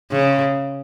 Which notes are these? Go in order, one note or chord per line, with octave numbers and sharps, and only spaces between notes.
C#3